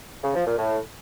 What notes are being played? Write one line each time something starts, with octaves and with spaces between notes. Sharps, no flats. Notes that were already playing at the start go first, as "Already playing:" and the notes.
C#3
F3
A#2
A2